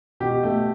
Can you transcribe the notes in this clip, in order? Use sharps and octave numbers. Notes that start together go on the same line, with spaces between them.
B2 G4
A3